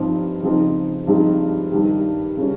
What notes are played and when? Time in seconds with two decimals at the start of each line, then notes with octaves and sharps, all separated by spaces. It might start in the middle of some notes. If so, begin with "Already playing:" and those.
Already playing: G2 F3 C4 D#4
0.42 C#3 F3 C4 D#4
1.07 G2 F3 G#3 C4 D#4
1.72 G2 D#3 G3
2.37 C#3 G3 C#4